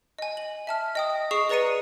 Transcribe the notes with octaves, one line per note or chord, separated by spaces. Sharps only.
D#5 G#5
F#7
E5 A5 F6
D#5 G5 D#6
G#4 D#5 C#6 D#6 C7 E7
G#4 B4 D5 A#5 C#7 D#7